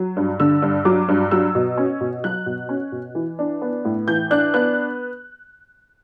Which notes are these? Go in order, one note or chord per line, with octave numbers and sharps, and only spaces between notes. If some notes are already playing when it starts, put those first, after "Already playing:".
Already playing: F#3
G2
D3 E6
G2
F#3 D6
G2
F#3 E6
B2
C#4
B2
F#3 F#6
B2
C#4
B2
E3
D4
B3
A2
E3 G6
D4 F#6
B3 F#6